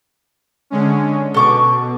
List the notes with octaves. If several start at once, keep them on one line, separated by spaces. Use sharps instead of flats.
D3 G#3 C#4
B2 A4 C#6 D6